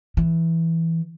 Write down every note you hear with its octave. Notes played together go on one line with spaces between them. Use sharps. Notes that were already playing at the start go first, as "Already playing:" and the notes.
E3